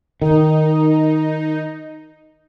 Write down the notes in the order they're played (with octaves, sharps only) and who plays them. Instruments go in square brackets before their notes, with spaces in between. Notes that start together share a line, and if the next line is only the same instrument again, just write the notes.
[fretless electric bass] D#3 [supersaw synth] D#4